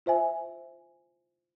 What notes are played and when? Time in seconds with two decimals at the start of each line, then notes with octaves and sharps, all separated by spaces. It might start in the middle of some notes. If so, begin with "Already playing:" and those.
0.06 F4 C5 E5 G#5